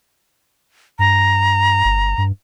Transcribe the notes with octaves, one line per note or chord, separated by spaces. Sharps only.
G2 A#5
G1
G2